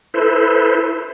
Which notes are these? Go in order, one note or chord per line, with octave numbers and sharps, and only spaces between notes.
E4 A4 B4 C5